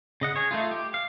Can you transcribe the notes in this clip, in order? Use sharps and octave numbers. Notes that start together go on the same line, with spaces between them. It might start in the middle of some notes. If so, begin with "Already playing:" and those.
C#3 D#5 F#5
G#4 C#5
A3 D#4 F4
G4
F5